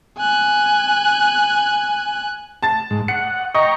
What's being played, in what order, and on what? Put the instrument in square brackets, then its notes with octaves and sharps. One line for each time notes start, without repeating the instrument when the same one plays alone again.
[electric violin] G#5 F#6
[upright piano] A5 A6
[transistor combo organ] G#2
[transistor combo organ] F#5 [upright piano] C#7
[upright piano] D#5 [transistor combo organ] G5 A#5 C#6